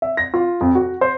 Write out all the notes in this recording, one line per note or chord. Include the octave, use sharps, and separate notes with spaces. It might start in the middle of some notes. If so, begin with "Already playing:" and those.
E5
A#6
F4
F2
F#4
C5